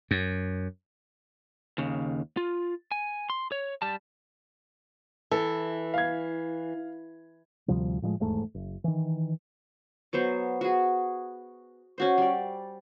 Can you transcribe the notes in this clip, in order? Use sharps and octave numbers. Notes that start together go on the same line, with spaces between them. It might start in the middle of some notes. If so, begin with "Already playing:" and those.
F#2
D#2 C#3
F4
G#5
C6
C#5
G3 A5
E3 A4
F5 G#6
D2 C3 F3 G3
A2 F3 G3 G#3
D#1 E2 G#2 A3
F#1
D#3 E3
F#3 B3 C5 C#6
F#4 G#4
C#4 F#4 C5
G3 D5